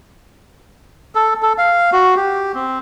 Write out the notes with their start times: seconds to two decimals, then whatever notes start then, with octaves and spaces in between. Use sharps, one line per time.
1.15 A4
1.42 A4
1.58 F5
1.93 F#4
2.16 G4
2.55 C4